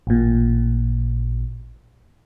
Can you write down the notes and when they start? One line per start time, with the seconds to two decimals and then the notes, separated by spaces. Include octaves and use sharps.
0.07 A1 A#2